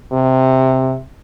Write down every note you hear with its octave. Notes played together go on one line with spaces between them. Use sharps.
C3